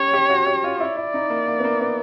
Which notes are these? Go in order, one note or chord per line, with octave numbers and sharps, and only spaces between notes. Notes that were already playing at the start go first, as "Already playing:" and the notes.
Already playing: C#4 G4 C#5
G4
F#4
G4
F4
E4 D5
E4
D#4
A#3
A#3
B3
A#3
B3